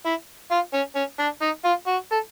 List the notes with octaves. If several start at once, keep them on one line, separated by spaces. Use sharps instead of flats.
E4
F4
C#4
C#4
D4
D#4
F4
F#4
A4